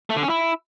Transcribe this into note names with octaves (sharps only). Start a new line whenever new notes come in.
A3
D3
C#4
E4